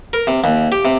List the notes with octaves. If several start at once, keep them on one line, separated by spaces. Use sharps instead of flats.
A#4
C3
D#2
G4
C3